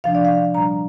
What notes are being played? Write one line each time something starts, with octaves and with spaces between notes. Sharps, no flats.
C3 F3 D4 F5
D5
F5
A#2 G3 D4 A#5